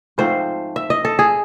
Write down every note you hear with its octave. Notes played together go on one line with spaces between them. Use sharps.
G#2 F3 A3 C4 C5
E5
D#5
A4
G#4